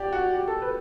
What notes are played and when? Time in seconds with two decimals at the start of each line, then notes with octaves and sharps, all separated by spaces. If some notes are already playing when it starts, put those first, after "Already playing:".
Already playing: G4 D5
0.12 F#4
0.34 G4
0.48 A4
0.62 B4